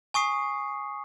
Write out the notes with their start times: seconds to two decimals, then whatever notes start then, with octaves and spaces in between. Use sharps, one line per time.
0.14 G#5 C#6 D#6 C7